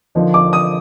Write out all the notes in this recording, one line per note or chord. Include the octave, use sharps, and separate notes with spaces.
D3 F3 A#3 D#4
D6
D#6